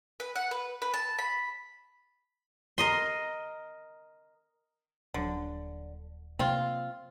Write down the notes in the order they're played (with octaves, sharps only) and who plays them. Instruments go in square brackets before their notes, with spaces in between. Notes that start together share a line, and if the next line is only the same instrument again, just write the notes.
[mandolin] B4
F#5
B4
B4
A5
B5
[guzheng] A#4 D#5 C6
[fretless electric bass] D#1 F#3 [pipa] D3
[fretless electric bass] C3 F#3 A#3 [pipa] C4 F4